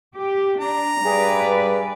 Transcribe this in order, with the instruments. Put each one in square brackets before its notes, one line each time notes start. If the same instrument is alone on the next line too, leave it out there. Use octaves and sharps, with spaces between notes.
[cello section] G4
[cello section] D4 [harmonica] A#5
[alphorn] G2 [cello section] G3 B4 D5 [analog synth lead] G#4